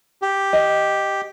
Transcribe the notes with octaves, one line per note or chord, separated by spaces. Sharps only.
G4
D#5